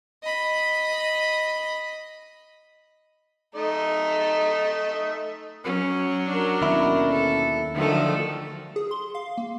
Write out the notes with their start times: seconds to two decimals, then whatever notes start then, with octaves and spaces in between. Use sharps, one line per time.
0.23 D#5 B5
3.55 A3 D#4 D#5
5.64 F#3 C#4
6.28 D4 A#4
6.62 D#2 B2 D3 C#4 E4
7.11 A4
7.75 D3 D#3 F3 F#3 A3 A4
8.76 G#4
8.91 C6
9.15 F5
9.38 A#3